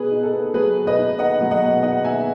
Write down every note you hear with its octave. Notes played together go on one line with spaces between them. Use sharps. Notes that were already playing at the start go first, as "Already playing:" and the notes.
Already playing: B2 G#4 B4
D#4
A4
B3
F#3 G#4 B4
B2
B4 D#5
D#4
B3 D#5 F#5
F#3
D#5 F#5
B2
D#4 D#5 F#5
B3 E5 G#5